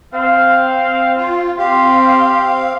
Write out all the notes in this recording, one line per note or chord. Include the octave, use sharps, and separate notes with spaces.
C4 F5
F4
C4 G4 F5 C6